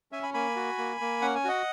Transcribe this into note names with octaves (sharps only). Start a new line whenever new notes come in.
C#4 E5 G#5
G#5 B5
A#3 G#5 B5
F#4
A#3
A#3
C#4 F#5
G#5
F#4 D#5 F#5